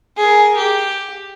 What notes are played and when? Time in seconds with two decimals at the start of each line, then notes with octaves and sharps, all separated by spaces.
0.17 G#4 A#4
0.57 G4